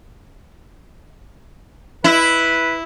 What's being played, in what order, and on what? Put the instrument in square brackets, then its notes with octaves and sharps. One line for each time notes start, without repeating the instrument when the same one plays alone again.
[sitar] E4 [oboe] B4